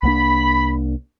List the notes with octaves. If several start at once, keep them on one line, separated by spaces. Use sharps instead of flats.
C2 A#3 D4 B5